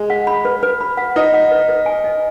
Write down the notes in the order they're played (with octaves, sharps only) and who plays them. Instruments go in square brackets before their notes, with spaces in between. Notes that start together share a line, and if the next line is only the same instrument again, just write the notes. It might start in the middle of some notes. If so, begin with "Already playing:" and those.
Already playing: [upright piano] G#3
[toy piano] F#5
B5
B4
B4
B5
F#5
[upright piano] D#4 [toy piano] B4
[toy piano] F#5
B4
B4
G#5
D#5